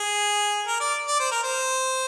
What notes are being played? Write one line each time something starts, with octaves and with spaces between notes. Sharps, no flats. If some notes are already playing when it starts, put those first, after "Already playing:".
Already playing: G#4
A#4
D5
D5
C5
A#4
C5